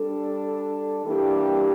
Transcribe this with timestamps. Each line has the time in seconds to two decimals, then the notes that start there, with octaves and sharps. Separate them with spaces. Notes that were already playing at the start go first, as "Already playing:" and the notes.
Already playing: G3 D4 A4
1.05 E3 G3 A#3 D4 G4